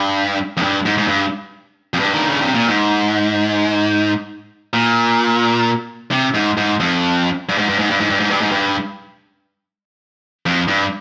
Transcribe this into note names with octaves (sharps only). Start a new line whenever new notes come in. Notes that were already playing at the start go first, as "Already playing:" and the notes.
Already playing: G2
F2
G2
G#2
G#2
G2
F2
G2
D#3
C#3
C3
A#2
G#2
A#2
C3
G#2
G#2
F2
G2
G#2
G2
G#2
G2
G#2
G2
G#2
G2
G#2
G2
F2
G2